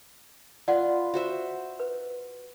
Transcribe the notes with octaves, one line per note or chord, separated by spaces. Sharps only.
F4 B4 D5 F#5
F#4 C5 E5
B4